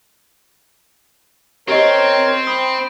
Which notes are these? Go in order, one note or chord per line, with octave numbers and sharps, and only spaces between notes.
C4 G4 A#4 C#5 D#5
B5 D#6